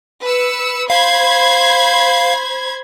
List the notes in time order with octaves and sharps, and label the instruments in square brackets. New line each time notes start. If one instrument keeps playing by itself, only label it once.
[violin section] B4 E6 C#7
[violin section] C5 B5 G#6 [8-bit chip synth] F5